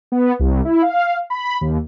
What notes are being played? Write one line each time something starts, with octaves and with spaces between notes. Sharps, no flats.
B3
C2
E4
F5
B5
D#2